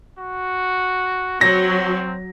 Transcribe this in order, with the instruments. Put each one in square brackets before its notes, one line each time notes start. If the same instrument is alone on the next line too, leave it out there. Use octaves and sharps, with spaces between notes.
[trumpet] F#4
[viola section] F#3 [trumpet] C4 [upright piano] A#6